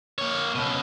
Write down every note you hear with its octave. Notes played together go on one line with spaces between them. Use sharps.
A#3 C#5
C#2 B2